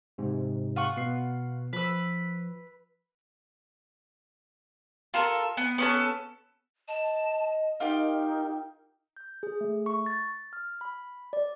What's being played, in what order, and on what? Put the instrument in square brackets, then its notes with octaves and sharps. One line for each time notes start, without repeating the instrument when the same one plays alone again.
[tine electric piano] G#2 C3
[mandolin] F4 F#5 C#6
[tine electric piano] B2 B3 C7
[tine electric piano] F3 [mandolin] B4 E6
[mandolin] F4 A4 A#4
B3
B3 C#4 A4
[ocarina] D#5 [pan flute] A5
[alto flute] D#4 [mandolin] F4 G4 G5 [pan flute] A#4
[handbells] G6
G#4
A3
C#6
A6
F6
B5
D5